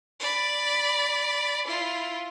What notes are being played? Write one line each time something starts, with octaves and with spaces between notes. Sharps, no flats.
D5 B5
E4 F4